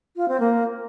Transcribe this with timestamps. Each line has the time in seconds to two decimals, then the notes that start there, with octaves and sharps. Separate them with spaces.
0.16 F4
0.28 C4
0.40 A#3